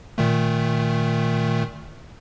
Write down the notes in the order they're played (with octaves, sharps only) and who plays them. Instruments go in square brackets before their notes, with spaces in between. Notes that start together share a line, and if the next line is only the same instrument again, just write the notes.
[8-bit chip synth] A#2 D#3 A3